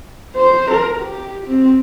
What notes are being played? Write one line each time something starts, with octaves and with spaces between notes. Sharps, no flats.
C5
A#4
G4
C4